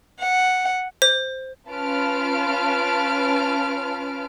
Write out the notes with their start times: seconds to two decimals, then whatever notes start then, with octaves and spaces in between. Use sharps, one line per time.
0.19 F#5
1.02 C5
1.68 C#4 F4 B4 A5 F6 D7